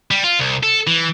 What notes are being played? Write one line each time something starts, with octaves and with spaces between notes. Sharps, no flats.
G3
F4
C2
A4
E3